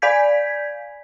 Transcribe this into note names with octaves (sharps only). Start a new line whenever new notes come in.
D5 F5 G#5 G6 G#6 B6